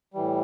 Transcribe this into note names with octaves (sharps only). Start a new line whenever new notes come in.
A2 E3 G3